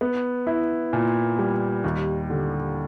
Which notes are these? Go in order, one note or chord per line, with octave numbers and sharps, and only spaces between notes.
B3
E4
A#2
G3
D#2
D3